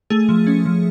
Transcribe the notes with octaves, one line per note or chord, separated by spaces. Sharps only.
A3 G#4
F3
C#4
F3